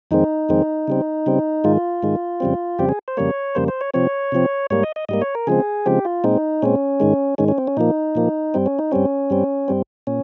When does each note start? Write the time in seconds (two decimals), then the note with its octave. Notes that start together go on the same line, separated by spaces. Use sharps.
0.11 F2 D#3 G#3 C4 D#4
0.49 F2 D#3 G#3 C4
0.88 C#3 G3 C4
1.26 C#3 G3 C4
1.64 G#2 D#3 G#3 F4
2.03 G#2 D#3 G#3
2.40 F2 C#3 G3 C4
2.79 F2 C#3 G3 C4 G4
2.89 G#4
3.08 C5
3.17 F2 C#3 G3 A#3 C#5
3.55 F2 C#3 G3 A#3 C5
3.68 C5
3.81 C#5
3.94 C3 F3 C4 C#5
4.32 C3 F3 C4
4.70 G#2 G3 A#3 C#5
4.83 D#5
4.96 D#5
5.09 G#2 G3 A#3 D#5
5.22 C#5
5.35 A#4
5.47 C#3 F3 G#3 C4 G#4
5.86 C#3 F3 G#3 C4 G4
6.05 F4
6.24 A#2 G#3 C4 D#4
6.62 A#2 G#3 C4 C#4
7.00 G#2 D#3 G#3
7.38 G#2 D#3 G#3 C#4
7.48 C#4
7.58 C4
7.67 C#4
7.77 A#2 F3 A#3 D#4
8.15 A#2 F3 A#3
8.54 G2 G3 C4
8.66 C#4
8.79 D#4
8.92 G2 G3 C4 C#4
9.30 G2 G3 C4
9.68 G2 G3 C4
10.07 A#2 C#4